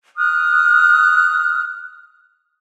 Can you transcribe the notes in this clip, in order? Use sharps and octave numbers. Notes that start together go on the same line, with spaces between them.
D#6 F6 F#6